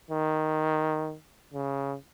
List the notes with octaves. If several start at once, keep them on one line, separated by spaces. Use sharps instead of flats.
D#3
C#3